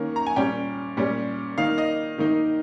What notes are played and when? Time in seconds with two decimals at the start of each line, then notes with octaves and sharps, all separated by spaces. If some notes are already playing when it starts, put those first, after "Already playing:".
Already playing: D#3 A#3 C#4
0.16 A#5
0.27 G#5
0.36 A#2 G3 C#4 G5
0.97 A#2 G3 C#4
1.58 D#3 A#3 D#4 F5
1.78 D#5
2.18 D#3 A#3 D#4